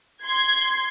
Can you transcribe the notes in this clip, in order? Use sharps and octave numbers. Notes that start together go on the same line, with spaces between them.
C6 G#6